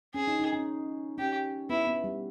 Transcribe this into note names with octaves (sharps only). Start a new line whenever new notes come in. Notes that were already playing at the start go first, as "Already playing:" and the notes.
C#4 G#4
D#4
D#4
C#4
C#4 G4
B3 E4
B3
G3